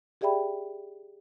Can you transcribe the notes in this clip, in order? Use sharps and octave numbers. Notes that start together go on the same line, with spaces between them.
G4 G#4 D5 E5 G5 B5